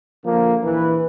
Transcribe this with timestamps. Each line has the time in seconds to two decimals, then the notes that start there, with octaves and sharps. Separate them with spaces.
0.25 D3 F3 A#3
0.63 A#1 E3 B4